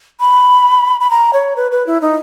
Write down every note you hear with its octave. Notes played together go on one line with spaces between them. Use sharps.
B5
B5
A#5
C#5
B4
B4
E4
D#4